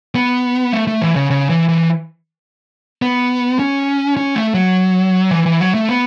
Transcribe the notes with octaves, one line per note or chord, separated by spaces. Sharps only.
B3
A3
A3
E3
C#3
C#3
E3
E3
B3
C#4
C#4
A3
F#3
E3
E3
F#3
A3
B3